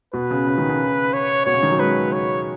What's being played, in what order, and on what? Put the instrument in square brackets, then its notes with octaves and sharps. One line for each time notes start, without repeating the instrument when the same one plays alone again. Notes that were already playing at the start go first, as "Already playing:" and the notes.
[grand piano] B2 [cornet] B4
[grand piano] C#3
C#3
D#3
C#3
[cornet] C#5
[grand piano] B2 [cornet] C#5
[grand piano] C#3
D#3
F#3
[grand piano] G#3 [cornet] B4
[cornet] C#5